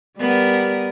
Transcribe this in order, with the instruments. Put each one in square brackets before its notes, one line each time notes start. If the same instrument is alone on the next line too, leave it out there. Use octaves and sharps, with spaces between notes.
[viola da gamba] G3 B3 A#4